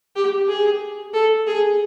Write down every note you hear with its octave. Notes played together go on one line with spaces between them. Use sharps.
G4
G#4
A4
G#4